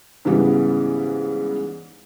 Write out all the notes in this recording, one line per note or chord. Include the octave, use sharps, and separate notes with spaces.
G#2 C#3 E3 G3 G#3 B3